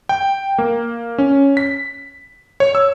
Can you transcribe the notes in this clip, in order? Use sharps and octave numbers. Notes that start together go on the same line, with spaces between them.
G5
A#3
C#4
B6
C#5
E6